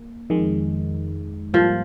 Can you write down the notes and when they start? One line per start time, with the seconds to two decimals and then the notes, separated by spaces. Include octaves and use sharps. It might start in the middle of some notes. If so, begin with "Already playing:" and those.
Already playing: A#3
0.30 F2 D#3 G#3
1.53 G#2 F3 G3 A#3 F4